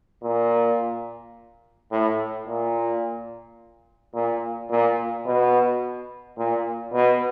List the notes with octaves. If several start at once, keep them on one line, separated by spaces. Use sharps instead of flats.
A#2
A2
A#2
A#2
A#2
B2
A#2
B2